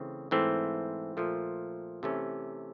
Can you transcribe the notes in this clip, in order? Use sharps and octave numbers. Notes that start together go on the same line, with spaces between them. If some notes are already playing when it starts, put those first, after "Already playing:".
Already playing: C#3 E3 A3 C4
G#2 E3 A3 C4
A#2 F3 A3
C3 E3 A3 C#4